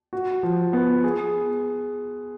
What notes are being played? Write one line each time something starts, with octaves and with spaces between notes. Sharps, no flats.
F#4
F3
B3
G#4